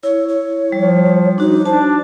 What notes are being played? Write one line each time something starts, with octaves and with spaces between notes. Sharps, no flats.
E4 C#5
C#5
F3 G3
D4 D#4 F#4
D4 C5 A5